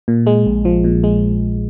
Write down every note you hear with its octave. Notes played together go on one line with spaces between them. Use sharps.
A#2
G#3
A#1
F3
A#2
G#3